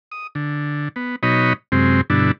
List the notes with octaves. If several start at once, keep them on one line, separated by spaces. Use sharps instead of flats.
D#6
D3
B3
B2 F#3 D#4 C#5 D#5 B5
F#2 C3 G#3 C4
G2 B2 D3 D4 E4